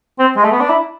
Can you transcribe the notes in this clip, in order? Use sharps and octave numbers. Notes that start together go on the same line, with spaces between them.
C4
G#3
A3
B3
D4
E4